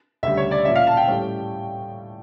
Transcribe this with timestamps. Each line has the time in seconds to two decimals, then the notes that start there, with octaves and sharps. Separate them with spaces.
0.23 D2 C#3 G3 E5
0.37 C#5
0.51 D5
0.65 A#2 F3 C#4 E5
0.76 F5
0.87 A5
0.97 G5
1.08 A2 G3 C#4